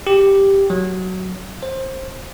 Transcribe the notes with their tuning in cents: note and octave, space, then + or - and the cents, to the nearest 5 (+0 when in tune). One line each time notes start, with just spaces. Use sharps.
G4 +0
F#3 +5
C5 +20